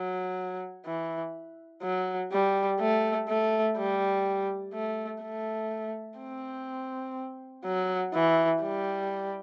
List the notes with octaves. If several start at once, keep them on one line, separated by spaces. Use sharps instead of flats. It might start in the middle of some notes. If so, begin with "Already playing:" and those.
Already playing: F#3
E3
F#3
G3
A3
A3
G3
A3
A3
C4
F#3
E3
G3